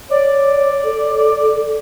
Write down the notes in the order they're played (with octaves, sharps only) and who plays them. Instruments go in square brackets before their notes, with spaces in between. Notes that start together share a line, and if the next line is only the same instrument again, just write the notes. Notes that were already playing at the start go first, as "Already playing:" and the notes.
[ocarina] C#5 [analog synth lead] D5
[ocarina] A4